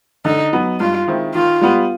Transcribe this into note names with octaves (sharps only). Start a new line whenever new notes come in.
D3 D#4
F#3 B3
G2 F4
D#3 G#3 C4 E4
D#3 F4
G3 B3